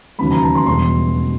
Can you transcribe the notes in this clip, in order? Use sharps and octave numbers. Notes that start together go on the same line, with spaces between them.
E1 D#2 C#3 F#3 A3 B5
A#5
A5
C6
E1 E2 B2 G3 C6